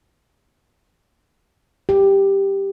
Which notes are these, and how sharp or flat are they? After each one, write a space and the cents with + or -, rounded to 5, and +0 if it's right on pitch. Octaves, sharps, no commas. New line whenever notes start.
G4 +5